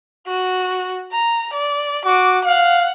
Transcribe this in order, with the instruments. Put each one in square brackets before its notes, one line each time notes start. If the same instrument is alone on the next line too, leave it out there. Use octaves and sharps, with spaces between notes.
[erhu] F#4
A#5
D5
[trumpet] F#4 [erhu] D6
[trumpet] F5 [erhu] F#5